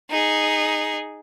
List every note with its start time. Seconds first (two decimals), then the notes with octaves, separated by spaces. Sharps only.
0.10 D#4 G#4